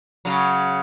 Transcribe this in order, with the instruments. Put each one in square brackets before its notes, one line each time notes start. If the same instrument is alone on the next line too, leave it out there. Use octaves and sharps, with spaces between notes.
[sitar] C#3 F#3